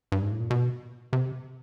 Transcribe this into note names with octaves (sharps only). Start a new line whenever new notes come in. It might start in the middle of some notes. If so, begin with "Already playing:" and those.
G2
G#2
A2
A#2
B2
C3